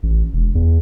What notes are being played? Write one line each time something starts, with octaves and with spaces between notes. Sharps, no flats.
A1
E1
E2